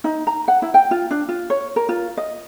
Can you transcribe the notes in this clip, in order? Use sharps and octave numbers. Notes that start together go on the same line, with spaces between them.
D#4
A#5
F#5
E4
G5
F4
D4
F4
C#5
A#4
F4
D#5